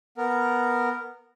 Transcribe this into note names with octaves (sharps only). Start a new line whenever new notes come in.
B3 A#4